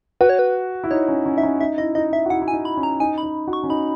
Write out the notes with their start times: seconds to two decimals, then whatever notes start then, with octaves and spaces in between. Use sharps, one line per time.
0.21 F#4 B4
0.29 C#5
0.39 B4
0.84 E4
0.91 D#4 C#5
1.08 C#4
1.26 C#4
1.37 D#4 E5
1.43 C#4
1.61 D#4 E5
1.78 E4 D#5
1.95 D#4 D#5
2.13 D#4 E5
2.26 F#4
2.30 E4 F#5
2.42 E4
2.48 G#5
2.53 D#4
2.65 B5
2.77 C#4
2.83 A#5
3.00 D#4 G#5
3.18 B5
3.23 D#4
3.47 F#4
3.53 C#6
3.64 C#4
3.70 D#4 B5